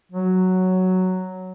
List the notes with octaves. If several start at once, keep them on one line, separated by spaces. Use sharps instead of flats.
F#3